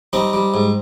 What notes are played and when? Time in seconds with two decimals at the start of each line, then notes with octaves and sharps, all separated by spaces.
0.13 G3 C4 D#4
0.33 G3
0.54 G#2